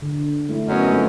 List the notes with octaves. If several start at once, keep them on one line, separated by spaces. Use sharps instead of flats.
D3
A3 E4
F#2 B3 C#5 D#5
A3 C4 F4